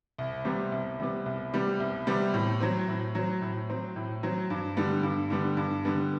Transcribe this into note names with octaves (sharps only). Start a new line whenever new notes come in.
C2
C3 G3 B3
C2
C3 G3 B3
C2
C3 G3 B3
C2
C3 G3 B3
A2
F#3 C4
A2
F#3 C4
A2
F#3 C4
A2
F#3 C4
G2
D3 G3 B3
G2
D3 G3 B3
G2
D3 G3 B3